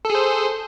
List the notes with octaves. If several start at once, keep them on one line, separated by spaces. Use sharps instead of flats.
G#4 A4 C5